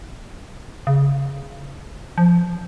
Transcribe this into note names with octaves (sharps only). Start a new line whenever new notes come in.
C#3
F3